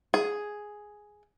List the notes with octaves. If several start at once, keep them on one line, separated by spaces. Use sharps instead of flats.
G#4